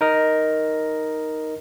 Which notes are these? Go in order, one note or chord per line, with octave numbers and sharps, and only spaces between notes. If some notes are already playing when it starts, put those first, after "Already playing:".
D#4 A#4 D#5